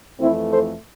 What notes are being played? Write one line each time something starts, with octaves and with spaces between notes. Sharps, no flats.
F2 E3 A3 C4 E4
A4 C5